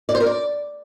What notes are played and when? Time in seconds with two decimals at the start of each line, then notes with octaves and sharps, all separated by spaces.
0.09 D5
0.15 C5
0.20 A#4
0.26 D5